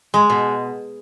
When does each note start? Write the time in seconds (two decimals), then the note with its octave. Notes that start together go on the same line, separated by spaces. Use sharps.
0.14 G#3
0.30 B2